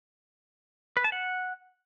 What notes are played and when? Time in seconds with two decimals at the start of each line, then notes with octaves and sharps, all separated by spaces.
0.97 B4
1.04 A5
1.12 F#5